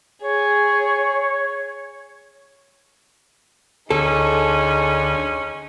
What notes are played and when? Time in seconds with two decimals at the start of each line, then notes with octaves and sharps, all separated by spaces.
0.23 G#4 C#5
3.90 D2 C#4 D#4 G#4 A4